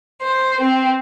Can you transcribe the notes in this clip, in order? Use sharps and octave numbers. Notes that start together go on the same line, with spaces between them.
C5
C4